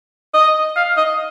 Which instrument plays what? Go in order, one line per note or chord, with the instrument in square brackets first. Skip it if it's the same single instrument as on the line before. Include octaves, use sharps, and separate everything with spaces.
[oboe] D#5
F5
D#5